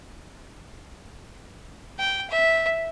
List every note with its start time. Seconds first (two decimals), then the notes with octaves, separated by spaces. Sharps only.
1.99 G5
2.30 E5